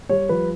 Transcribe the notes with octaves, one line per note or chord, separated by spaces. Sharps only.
G3 C#5
F3 B4